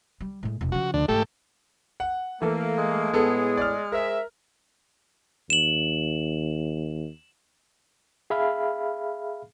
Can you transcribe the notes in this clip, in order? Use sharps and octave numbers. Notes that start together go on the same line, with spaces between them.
G3
A2 G#3
E1 C2
C#3 F3 F#4
D2 D4
G#2 E3 A3 G4 A4
F#5
E3 A3 A#3 A4
G#3
A2 B3 G#4 A4
D5 F6
G#4 A#4 C5 E5
D#2 E7 F#7
G#4 E5 F5 B5 F6